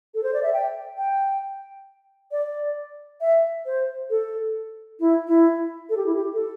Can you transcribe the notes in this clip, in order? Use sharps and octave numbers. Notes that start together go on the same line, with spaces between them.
A4
C5
D5
E5
G5
G5
D5
E5
C5
A4
E4
E4
A4
G4
E4
G4
A4